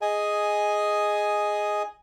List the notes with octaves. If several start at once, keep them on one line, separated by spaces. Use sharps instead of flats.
G#4 D#5 G#5